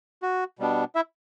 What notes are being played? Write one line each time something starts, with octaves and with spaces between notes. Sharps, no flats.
F#4
B2 G3 B3 D4
E4 E5